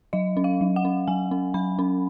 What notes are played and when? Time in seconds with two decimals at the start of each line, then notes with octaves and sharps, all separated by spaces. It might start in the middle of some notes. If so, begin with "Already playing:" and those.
0.13 F#3 D#5
0.37 C#4
0.44 F5
0.61 F#3
0.76 F#5
0.85 C#4
1.08 F#3 G#5
1.31 C#4
1.54 F#3 B5
1.79 C#4